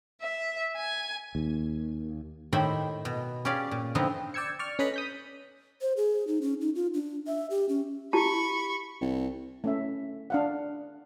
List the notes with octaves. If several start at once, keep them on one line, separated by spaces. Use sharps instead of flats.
E5
G#5
D#2
A2 D#3 G4 C5 E5 B5
B2
C#4 G4 G#4 D5 F5
A#2
D3 F3 B3 C4 D#4
D5 G5 E6 G#6 C#7
D5 C#6 F6
C#4 A4 B4 D#5 A#5 B5
D#6 G6 B6
C5
G#4
D#4
C#4
D#4
F4
D4
E5
G4
C#4
E4 G4 A5 B5 C#6
C2
A3 C#4 E5
D4 F5 F#5